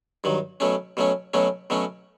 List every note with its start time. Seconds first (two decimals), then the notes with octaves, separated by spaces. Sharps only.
0.24 G2 D#3 F#3
0.60 B2 F#3 A3 C#4
0.97 B2 F#3 A3 C#4
1.34 B2 F#3 A3 C#4
1.70 B2 F#3 A3 C#4